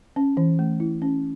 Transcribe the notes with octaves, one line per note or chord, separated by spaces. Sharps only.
C#4
E3
A3
E4
C#4